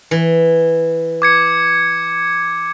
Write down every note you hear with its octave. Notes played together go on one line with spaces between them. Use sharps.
E3
D6 G#6 C#7